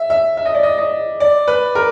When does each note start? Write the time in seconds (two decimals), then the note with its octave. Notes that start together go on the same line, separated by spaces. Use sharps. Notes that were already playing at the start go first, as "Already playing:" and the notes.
Already playing: E5
0.10 E5
0.37 E5
0.45 D#5
0.55 D5
0.63 D#5
0.78 D#5
1.20 D5
1.48 B4
1.75 A#4